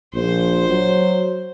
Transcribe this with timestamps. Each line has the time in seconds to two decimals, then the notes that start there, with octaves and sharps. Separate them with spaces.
0.14 A#1 C5
0.69 F#3